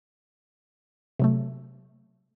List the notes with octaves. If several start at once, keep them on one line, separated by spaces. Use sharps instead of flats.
C3 F#3 A3